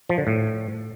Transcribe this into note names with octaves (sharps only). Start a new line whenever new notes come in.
F3
D3
A2